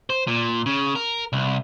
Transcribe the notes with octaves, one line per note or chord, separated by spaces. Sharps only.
C5
A#2
C#3
A#4
C2